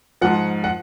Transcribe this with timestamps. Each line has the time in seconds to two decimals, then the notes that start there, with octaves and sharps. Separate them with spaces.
0.21 G#2 F3 F#5
0.64 F#5